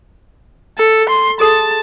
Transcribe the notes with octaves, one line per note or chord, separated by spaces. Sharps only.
A4
C6
G#4 A4 A5